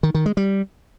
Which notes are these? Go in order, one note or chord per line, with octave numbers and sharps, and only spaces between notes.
D#3
D#3
G#3
G3